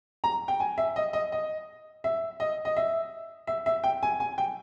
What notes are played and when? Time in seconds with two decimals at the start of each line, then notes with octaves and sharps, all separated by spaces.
0.24 A#5
0.48 G5
0.60 G#5
0.78 E5
0.96 D#5
1.13 D#5
1.32 D#5
2.04 E5
2.40 D#5
2.65 D#5
2.77 E5
3.47 E5
3.66 E5
3.84 G5
4.03 G#5
4.20 G#5
4.38 G5